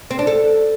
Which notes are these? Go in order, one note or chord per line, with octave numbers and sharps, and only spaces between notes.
C4
D4
A4